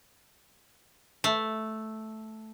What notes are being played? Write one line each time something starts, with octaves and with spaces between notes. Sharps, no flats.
A3